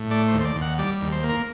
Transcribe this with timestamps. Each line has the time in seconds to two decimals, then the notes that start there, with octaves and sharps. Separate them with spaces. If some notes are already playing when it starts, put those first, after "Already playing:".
Already playing: A2
0.11 A3 D5
0.28 C5
0.33 D#2
0.40 C5
0.45 D5
0.56 D#2
0.62 F#5
0.78 G3 D5
1.01 D#2
1.12 C5
1.23 A#3
1.29 A#4